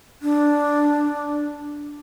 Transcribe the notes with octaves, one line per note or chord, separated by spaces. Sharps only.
D4